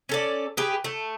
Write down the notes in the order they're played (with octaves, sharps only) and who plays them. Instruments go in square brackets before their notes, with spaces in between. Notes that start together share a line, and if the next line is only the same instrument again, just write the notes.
[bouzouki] C#4 A4 D5
G4 G#4 B4
A3